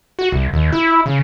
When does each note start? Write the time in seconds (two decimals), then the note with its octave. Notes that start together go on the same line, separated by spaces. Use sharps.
0.19 F#4
0.32 C2
0.53 D#2
0.72 E4
1.06 C#3